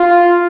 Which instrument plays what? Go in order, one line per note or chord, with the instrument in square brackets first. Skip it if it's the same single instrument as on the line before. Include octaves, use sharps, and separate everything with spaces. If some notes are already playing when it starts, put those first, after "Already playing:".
Already playing: [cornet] F4